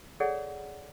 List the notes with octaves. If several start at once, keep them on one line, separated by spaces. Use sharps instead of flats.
G#4 A4 C#5 D5 F#5